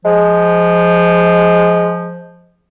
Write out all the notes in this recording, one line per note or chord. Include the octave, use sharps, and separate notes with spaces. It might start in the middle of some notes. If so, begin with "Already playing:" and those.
F3 G#3